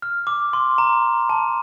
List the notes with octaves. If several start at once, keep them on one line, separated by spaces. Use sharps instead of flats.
F6
D6
C6
A#5
A5